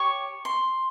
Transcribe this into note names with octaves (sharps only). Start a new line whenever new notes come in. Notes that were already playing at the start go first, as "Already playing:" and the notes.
Already playing: G4 C#5 C#6
C6